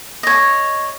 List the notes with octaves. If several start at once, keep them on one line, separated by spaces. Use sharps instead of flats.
C#5 D#5